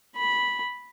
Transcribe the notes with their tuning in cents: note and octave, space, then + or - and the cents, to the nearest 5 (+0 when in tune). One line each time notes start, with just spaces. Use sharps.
B5 -10